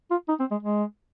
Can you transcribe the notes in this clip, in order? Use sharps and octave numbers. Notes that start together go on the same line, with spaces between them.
F4
D#4
C4
G#3
G#3